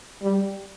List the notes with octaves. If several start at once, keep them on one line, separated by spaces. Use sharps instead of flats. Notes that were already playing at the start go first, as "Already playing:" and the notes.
G3